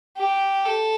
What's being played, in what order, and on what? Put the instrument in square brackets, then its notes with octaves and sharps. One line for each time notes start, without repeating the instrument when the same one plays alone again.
[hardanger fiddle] G4
A4